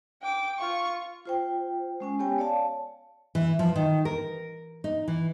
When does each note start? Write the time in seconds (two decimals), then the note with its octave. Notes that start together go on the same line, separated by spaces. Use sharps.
0.22 G5 D6
0.59 F4 C#6
1.26 F4 C5 G5
2.00 G#3 C#4 G#5
2.19 B3 G4 C#5 G5 G#5
2.38 C#5 D5 F5 A5
3.35 E3
3.59 F3
3.76 D#3
4.05 A#4
4.84 D#4
5.08 E3